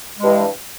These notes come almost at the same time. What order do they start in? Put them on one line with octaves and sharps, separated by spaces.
G#3 G2 E3